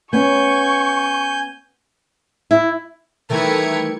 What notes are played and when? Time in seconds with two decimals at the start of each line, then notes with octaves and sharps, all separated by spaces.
0.13 B3 C#4 G#5 C#6 G6
2.51 E4
3.30 D#3 E3 G3 A3 A#4 B4 G#6 C#7